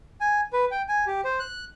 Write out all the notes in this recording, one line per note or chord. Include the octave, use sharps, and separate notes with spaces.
G#5
B4
G5
G#5
G4
C5
F#6